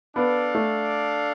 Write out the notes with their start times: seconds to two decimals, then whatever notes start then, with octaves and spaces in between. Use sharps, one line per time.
0.16 B3 D4 A4 D5 F5
0.55 A3